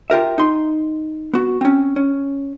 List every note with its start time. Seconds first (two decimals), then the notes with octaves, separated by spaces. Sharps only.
0.10 F4 G4 A#4 E5
0.38 D#4 C6
1.33 B3 F#4
1.61 C4 C#4
1.96 C#4